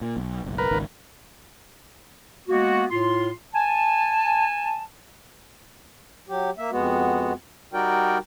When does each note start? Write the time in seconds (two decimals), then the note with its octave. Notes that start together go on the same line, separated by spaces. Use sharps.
0.01 A#2
0.17 B1
0.44 F#1 B1
0.58 A#4 B4
0.71 G#1 C#2 D#3
2.48 G#3 A#3 B3 F#4
2.91 A2 F4 C6
3.53 G#5 A5
6.29 F#3 G4
6.58 A#3 E5
6.71 F2 G#3 B3 F#4
7.73 G3 D#4 F#4 A#4 D5 G5